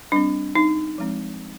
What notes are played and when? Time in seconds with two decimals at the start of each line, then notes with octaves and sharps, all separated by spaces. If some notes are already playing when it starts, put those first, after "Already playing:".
0.12 G3 C4 D4
0.55 D#4
0.98 F3 G#3 C4